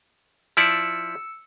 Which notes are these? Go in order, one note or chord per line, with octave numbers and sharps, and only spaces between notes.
F3 E4 D5 E6 C#7